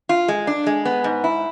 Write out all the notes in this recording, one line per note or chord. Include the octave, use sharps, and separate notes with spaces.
F4
G#3
D4
G#3
B3
G#2
E4